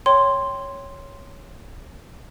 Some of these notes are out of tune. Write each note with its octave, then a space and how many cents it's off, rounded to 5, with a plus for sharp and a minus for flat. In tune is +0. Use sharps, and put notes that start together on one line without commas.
C#5 +0 G5 +0 C6 +0